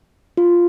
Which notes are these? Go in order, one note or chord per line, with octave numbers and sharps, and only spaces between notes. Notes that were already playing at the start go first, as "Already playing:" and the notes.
F4